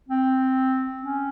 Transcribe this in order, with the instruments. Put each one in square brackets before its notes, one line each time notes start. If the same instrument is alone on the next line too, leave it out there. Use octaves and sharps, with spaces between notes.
[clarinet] C4
C#4